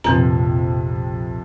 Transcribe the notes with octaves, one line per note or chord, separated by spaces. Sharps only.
A#1 F2 C3 D#3 F3 C4 A#5